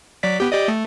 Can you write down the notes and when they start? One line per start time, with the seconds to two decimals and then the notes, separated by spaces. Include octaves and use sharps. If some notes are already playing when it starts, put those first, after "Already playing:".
0.23 F#3 D5 B6
0.40 B3 G4
0.52 G4 D5 D#5
0.68 A3